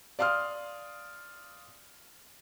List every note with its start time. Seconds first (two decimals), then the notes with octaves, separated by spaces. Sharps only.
0.19 D5 F5 C6 D#6 F6